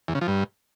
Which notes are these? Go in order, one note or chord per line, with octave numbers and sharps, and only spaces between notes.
E2
C#3
F3
G2